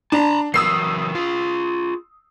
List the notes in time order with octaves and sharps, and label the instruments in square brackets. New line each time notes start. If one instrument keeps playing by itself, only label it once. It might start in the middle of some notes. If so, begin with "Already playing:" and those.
[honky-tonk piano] D4 [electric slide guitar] A5 A#5
[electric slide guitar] E3 F#3 A#4 [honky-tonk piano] D#6 E6 C7
[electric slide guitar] F4 G#4